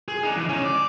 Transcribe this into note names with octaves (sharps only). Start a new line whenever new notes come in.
G#4
D4 D#4
E3
C#4 D#4
D5